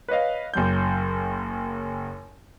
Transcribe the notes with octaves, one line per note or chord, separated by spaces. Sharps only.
B4 C#5 D#5 F5
F#1 F#2 G6